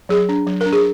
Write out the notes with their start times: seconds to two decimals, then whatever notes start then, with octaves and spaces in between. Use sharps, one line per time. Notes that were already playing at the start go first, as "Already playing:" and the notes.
0.09 F#3 G#4
0.29 D4
0.47 F#3
0.61 D4 A#4
0.73 G#4